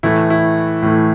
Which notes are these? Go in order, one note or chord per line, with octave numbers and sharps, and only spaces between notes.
A2 E3 A3 E4
E4
A2 E3 A3